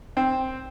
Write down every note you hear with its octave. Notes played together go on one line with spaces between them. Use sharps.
C4